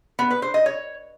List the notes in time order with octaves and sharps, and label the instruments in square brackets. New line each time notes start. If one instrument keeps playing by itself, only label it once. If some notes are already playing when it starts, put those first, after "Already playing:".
[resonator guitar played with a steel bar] B3
B4
C5
D#5
C#5